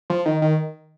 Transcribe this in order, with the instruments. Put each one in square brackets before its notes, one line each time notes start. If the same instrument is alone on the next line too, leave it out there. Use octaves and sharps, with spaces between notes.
[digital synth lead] F3
D#3
D#3